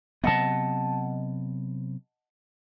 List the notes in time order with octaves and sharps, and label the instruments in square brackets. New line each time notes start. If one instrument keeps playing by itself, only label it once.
[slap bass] C3 F#3 B3 [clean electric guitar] D#5 F#5 A5